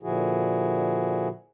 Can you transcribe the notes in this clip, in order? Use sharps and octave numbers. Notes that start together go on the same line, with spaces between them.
A#2 D3 F3 E4 F#4 G#4